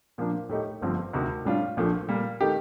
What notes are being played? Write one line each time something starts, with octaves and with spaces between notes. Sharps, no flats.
A#2 F3 A#3 D4
A2 A3 D#4 G4
G1 G2 D3 F3 C4
D2 C3 D#3
A2 G3 D4 F4
A#1 A#2 F3 A3 D4
A#2 G3 A#3
D#3 A3 D#4 G4